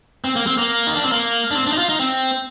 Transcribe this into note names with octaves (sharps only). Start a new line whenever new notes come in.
C4
A#3
C4
A#3
D#4
D4
C4
A#3
D4
C4
D4
D#4
F4
D#4
C4